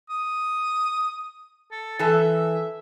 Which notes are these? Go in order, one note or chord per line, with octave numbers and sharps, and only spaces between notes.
D#6
A4
E3 A4 E5